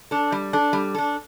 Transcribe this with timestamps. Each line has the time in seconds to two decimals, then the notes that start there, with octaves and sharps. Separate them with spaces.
0.11 D4 A4
0.32 G3
0.53 D4 A4
0.73 G3
0.95 D4 A4